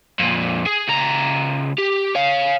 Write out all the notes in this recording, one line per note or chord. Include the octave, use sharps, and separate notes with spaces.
F2 A#2
G#4
C#2 A#5
G4
C#5 F5